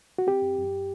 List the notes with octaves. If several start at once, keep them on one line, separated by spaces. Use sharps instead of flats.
F#4
C4 G4
F#2
F#2